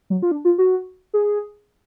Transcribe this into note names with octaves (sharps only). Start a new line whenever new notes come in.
F#3
F4
D4
F4
F#4
G#4